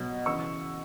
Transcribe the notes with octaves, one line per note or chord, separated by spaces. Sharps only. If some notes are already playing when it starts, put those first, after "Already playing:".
Already playing: B2 F#3
C#3 E3 C#6 E6